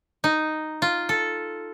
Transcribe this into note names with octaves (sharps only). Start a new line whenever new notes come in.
D#4
F4
A4